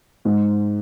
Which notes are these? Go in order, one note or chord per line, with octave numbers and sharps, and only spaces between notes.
G#2